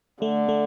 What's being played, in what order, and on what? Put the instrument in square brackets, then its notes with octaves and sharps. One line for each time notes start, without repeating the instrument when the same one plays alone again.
[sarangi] D3 [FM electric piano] A3
[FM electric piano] A3